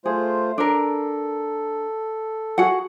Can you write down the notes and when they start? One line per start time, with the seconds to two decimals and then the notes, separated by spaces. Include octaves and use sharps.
0.06 A3 F4 G#4 C5
0.58 D4 A4 A#4
2.58 F#4 G#4 F#5